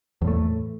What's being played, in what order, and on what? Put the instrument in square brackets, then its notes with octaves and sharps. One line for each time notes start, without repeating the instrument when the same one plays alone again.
[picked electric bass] E2
A2
A3